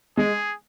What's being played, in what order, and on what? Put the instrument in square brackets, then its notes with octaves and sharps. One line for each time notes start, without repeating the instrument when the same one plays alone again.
[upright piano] G#3 [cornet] G#4